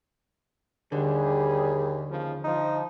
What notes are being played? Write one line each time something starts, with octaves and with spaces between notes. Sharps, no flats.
D#2 D3 G3 G#4
D#2 C#3 F3
F3 D#4